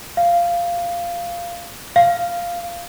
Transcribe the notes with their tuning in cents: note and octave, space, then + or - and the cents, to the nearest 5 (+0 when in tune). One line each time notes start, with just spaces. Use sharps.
F5 -10
F5 -5